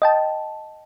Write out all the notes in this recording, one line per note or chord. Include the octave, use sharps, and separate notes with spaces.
D#5 G5 A5